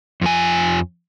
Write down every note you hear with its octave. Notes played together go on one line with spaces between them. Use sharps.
F2 F3 G#5